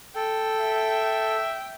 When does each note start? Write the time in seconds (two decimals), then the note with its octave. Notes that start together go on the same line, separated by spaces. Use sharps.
0.16 A4 G5
0.58 E5